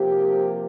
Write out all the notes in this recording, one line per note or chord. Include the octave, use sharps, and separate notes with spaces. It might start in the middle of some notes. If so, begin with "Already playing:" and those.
Already playing: C3 F3 A#3 G4